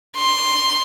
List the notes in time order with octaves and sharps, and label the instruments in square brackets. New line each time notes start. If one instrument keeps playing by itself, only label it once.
[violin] C6